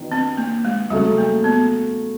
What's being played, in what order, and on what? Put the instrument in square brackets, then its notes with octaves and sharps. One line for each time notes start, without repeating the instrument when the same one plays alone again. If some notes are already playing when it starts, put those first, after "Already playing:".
Already playing: [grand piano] D#3 F#3 B3 D4 F4
[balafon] C4
A#3
G#3
[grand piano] C#3 F#3 A3 [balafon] G3
[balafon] A#3
B3